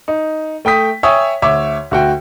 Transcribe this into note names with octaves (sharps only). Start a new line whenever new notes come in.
D#4
A3 G5 D#6 B6
C#5 E5 G5 G#5 D#6
D2 C#5 E5 C#6 D6
D2 F#4 G5